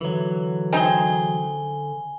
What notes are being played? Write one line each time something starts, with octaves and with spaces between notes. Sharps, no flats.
D3 E3 F#3
C4 D#4 G#4 G#5 G7